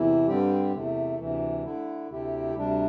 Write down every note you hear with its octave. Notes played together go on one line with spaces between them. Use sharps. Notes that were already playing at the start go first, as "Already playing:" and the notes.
Already playing: E2 C3 E3 E4
G2 D3 G3 C4 G4
E2 C3 A3
D2 C3 E3
D3 A3 E4
D2 C3 A3 E4 G4
D2 C3 G3 D4